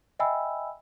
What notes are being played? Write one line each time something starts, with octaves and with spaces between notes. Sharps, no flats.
D#5 E5 G5 G#5 B5 E6